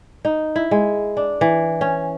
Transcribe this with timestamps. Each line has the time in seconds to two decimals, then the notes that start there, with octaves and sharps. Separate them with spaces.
0.25 D#4
0.56 E4
0.71 G#3
1.17 D4
1.41 E3
1.81 C#4